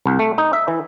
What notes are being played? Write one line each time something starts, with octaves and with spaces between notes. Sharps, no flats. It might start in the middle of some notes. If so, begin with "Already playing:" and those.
C2
A3
D#4
E5
E3